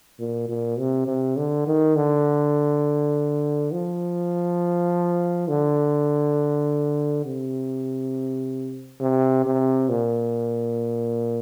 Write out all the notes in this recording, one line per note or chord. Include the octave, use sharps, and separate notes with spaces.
A#2
A#2
C3
C3
D3
D#3
D3
F3
D3
C3
C3
C3
A#2